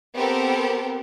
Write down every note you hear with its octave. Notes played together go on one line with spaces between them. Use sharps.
B3 C4 G4 A4 A#4